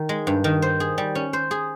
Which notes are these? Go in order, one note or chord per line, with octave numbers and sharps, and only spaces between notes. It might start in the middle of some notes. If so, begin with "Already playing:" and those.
Already playing: D#3
G#3
G2
D#3
C5
G#4
G3
C#4
C5
G#4